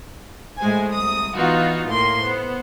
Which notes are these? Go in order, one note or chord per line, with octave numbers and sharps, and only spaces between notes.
A2 G#3 C5 G#5
C2 D#6
E3 B3 D#4 F4 F#4
A2 A#3 C6
B3 C5